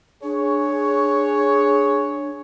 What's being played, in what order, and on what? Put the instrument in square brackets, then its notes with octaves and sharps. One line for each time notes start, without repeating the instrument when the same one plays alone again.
[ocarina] D4 [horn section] G#4 C#5